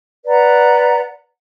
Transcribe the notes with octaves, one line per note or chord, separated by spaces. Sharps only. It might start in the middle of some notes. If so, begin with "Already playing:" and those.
B4 D5 F#5 A#5